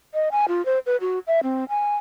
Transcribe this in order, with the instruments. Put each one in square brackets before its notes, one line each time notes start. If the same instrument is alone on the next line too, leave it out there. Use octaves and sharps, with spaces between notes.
[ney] D#5
G#5
F4
C5
B4
F#4
E5
C4
G#5